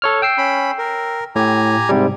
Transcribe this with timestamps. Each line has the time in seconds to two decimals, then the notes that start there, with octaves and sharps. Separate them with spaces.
0.02 A4 C#5 F6
0.22 G5 E6 C7
0.38 C#4 B5
0.78 A#4
1.36 A2 G4 G#5 A#5
1.89 G#2 C3 G3